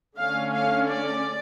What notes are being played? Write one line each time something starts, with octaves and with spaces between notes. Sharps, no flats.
D3 A3 C#4 F5
F5
D5